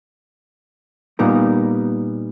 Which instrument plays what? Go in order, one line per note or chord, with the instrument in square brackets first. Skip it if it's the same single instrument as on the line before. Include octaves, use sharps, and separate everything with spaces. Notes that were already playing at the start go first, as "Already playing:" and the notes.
[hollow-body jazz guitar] A#2 G3 B3 D#4 A#4